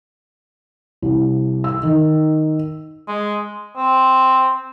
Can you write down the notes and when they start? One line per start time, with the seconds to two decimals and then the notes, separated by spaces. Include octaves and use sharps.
1.02 C2
1.64 E6
1.83 D#3
3.08 G#3
3.77 C4